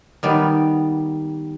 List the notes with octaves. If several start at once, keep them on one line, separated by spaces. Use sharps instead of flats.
D#3 G3 B3